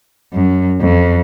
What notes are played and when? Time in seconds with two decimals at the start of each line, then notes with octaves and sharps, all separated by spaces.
0.34 F#2
0.80 F2